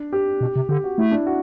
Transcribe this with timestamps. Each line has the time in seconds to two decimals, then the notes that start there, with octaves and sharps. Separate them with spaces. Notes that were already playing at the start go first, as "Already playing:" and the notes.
Already playing: D4
0.13 G4
0.41 B2
0.56 C3
0.69 D3 G4
0.84 F#4
0.98 A3 E4
1.12 D4
1.26 F#4